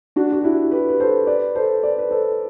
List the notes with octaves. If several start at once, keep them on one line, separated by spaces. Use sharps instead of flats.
D4 F#4
F#4
E4 G4
G4 B4
B4
A4 C5
B4 D5
A4 C5
B4 D5
B4
A4 C5